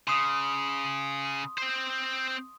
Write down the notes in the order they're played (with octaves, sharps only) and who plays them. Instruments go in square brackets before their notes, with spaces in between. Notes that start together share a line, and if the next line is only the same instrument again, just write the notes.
[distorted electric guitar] C#3 [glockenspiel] C6 D#6
[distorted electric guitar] C4 C5